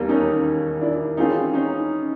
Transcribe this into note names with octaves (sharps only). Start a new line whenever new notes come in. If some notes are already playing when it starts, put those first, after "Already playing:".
Already playing: E1 D#2 D#3 G3 A#3
C#4 D#4
D4 E4
E3 G#3 C4 C#4 D#4 F4 G#4
C#4 D#4